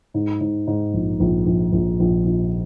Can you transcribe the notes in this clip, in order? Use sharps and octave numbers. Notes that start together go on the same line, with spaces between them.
G#2
G#2
G#2
A#1
A#1
A#1
A#1
A#1
A#1